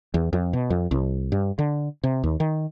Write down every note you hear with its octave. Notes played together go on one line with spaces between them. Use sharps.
E2
F2
B2
F2
C2
G2
D3
C3
D#2
D#3